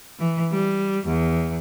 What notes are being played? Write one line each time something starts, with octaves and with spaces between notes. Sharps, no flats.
E3
G3
E2